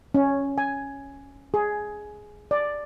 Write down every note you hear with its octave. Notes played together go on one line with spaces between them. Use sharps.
C#4
G#5
G#4
D5